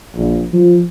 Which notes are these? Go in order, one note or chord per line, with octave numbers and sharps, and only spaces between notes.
A#1
F3